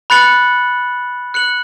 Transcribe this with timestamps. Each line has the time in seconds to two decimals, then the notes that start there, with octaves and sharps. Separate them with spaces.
0.10 B5 F#6 A6 C#7 F#7
1.34 F#6 C#7 F#7